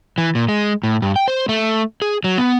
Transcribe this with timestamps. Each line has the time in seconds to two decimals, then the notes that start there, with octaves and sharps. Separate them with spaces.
0.18 E3
0.35 A#2
0.49 G#3
0.83 A2
1.02 G2
1.16 G5
1.28 C5
1.49 A3
2.02 G#4
2.24 F#3
2.38 B3